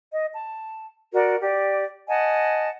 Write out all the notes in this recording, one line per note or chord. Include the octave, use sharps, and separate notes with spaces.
D#5
A5
F#4 A#4 D5
G4 D5
D#5 F#5 G#5 A5